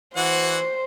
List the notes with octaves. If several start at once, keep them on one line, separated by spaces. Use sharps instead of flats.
E3 F#4 C5 F#5